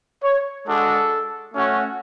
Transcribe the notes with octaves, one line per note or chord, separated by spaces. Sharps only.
C#5
G#3 D4 F#4 A4
A3 C#4 F#4